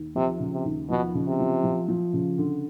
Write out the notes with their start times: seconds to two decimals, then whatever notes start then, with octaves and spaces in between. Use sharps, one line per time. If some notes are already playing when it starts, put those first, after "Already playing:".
Already playing: D#2
0.15 C3 F3
0.40 C#3
0.53 C3
0.65 D#2
0.90 B2 F3
1.14 C#3
1.27 C3
1.40 F3
1.64 F3
1.88 F3
2.13 C#3
2.38 D3